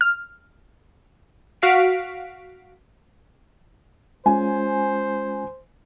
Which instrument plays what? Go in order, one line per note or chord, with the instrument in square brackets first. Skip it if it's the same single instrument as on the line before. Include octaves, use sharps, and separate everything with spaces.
[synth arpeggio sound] F6
[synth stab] F#4 F5 B6 D7
[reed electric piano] G#3 C#4 F4 [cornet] C5 [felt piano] G#5